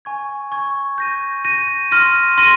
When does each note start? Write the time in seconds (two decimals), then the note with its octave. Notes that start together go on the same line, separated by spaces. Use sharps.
0.05 G#5 C#6 G#6
0.52 G#5 C#6 G#6
0.98 G6 A#6 D#7
1.45 G6 A#6 D#7
1.91 C6 F6 A#6 D#7
2.38 C6 F6 A#6 D#7